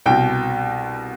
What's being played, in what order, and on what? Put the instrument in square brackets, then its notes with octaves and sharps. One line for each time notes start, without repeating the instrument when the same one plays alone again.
[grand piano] C2 B2 G5